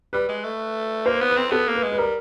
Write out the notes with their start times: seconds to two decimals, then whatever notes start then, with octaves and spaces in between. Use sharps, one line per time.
0.13 G3 B4
0.29 G#3
0.44 A3
1.06 A#3 C5
1.21 B3
1.29 B4
1.37 C4
1.51 B3 A4
1.67 A#3
1.75 B4
1.83 G#3
1.92 B4
1.98 G3 A#4